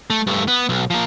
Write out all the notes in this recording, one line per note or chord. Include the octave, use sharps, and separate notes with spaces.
A3
G2 A3
B3
B1
F3 A#3